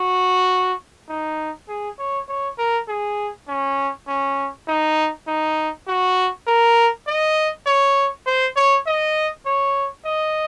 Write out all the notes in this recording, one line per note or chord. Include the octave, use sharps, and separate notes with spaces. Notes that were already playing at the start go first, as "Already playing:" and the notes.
Already playing: F#4
D#4
G#4
C#5
C#5
A#4
G#4
C#4
C#4
D#4
D#4
F#4
A#4
D#5
C#5
C5
C#5
D#5
C#5
D#5